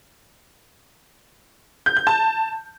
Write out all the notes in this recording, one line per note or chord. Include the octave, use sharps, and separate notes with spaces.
G6
G6
A5